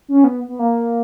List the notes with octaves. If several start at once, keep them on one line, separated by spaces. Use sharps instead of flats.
C#4
B3
B3
A#3